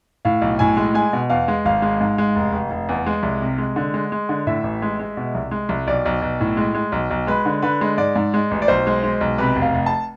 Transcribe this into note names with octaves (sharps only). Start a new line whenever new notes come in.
A2 F5
B1
A2 G#5
G#3
G#3 G#5
B2
E2 F5
G#3
G#1 F5
G#3
G#2
G#3
F1
F1
F1
E2
G#3
C2
C3
G#3
D3
G#3
G#3
D3
A2 E5
A1
G#3
G#3
B2
C2
G#3
C2
B1 D5
B1
B1
A2
G#3
G#3
B1
B1
G#3 B4
D3
D3 B4
G#3
G#2 D5
G#2
G#3
A1
D5
B1 C5
G#3
G#3
B1
C3 B4
F1
F5
F1
A5